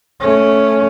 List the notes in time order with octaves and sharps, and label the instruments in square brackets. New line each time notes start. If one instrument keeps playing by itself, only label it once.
[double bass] A3 C#4